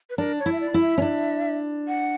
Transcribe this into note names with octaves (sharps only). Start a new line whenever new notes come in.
B4
D4 A#4
C#5
E4
E5
D5
E4
E5
C#4
D4
F#5